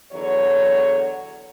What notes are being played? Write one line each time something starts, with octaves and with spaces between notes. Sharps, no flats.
E2 D3 F#3 C#5